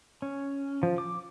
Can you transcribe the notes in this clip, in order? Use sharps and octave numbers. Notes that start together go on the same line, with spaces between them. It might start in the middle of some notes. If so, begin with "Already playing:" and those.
C#4
F3
D6